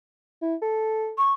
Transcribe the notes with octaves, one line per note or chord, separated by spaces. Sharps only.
E4
A4
C#6